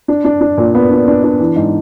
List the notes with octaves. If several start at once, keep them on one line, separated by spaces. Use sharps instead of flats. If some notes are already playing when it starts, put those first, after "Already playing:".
D4
D4
D4
A#2
B3
D4
D4
D4
E3
G#2